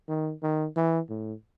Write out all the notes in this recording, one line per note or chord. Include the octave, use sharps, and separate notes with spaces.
D#3
D#3
E3
A2